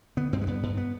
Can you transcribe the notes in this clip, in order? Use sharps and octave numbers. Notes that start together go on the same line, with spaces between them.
D3 B3
G2 C4
G#3
G2 B3
G2
B3